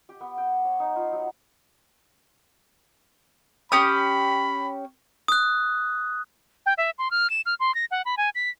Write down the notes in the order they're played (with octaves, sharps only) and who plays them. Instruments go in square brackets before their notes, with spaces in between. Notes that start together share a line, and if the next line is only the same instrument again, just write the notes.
[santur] G4
B3
G5
C#5
D#4
F4
F#3
[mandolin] C#4 G4 D#6 [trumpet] B5
[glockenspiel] D#6 F#6
[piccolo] G5
E5
C6
F6
E7
F6
C6
A#6
F#5
B5
G#5
B6